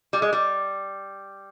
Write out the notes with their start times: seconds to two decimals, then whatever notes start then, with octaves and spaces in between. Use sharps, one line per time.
0.13 G3
0.22 G#3
0.33 G3